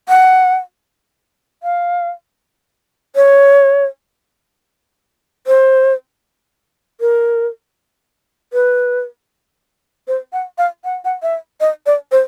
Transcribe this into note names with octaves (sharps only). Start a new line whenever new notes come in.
F#5
F5
C#5
C5
A#4
B4
C5
F#5
F5
F#5
F#5
E5
D#5
D5
C5